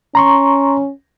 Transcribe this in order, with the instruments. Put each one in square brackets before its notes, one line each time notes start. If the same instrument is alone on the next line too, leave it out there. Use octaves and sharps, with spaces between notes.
[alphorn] C#4 [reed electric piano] A#5 C6 C#6